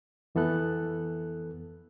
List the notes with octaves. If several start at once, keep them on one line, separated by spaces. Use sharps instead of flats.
F2 E3 B3 A4 F#6